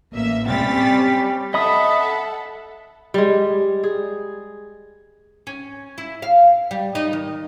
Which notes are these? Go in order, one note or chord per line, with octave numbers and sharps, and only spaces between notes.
A1 A#3 E5
G3 C4 C#4 A6 B6
A4 D#5 E5 F#5 B5 D#6
G3 G#3
G#4
C#4
E4
F5
G3
D#4
D#3